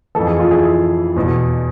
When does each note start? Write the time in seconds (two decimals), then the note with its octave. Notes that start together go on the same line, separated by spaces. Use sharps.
0.15 F2 E3 A4
0.27 G#4
0.39 F4
0.51 E4 G#4
1.16 E2 B2